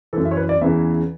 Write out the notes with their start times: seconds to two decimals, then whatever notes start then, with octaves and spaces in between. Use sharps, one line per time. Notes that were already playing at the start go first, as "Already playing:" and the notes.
0.13 F#2 E3 A4
0.25 E5
0.31 C#5
0.37 B4
0.49 D5
0.61 E2 C#3 E3 E5